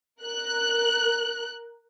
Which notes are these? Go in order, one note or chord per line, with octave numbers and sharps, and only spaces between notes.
A#4 F#6